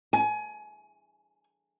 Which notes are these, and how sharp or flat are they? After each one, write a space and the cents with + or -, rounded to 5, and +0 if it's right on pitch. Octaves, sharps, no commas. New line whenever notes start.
G#5 +25